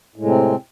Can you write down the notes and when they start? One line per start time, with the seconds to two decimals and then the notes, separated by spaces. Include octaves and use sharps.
0.16 A2
0.19 G#3
0.23 C3
0.27 C4